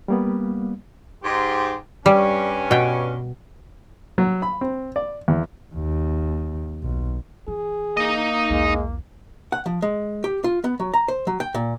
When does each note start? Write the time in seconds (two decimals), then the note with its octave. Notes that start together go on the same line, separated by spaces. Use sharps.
0.08 G3 A#3 B3
1.24 G#2 G4 C6
2.06 G2 G3 C#4
2.71 B2 G5
4.18 F#3
4.42 B5
4.61 C4
4.96 D5
5.28 E2
5.75 D#2
6.83 B1
7.48 E3 G#4
7.97 A#3 D#4 D#5
8.50 B1 E2 G#3
9.52 F#5
9.66 F3
9.82 G#3
10.24 G4
10.44 F4
10.64 B3
10.80 F#3
10.94 A#5
11.08 C5
11.27 F#3
11.40 G5
11.54 A#2